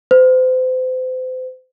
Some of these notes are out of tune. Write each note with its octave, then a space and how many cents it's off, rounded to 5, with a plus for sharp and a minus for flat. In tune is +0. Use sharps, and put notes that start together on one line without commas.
C5 -35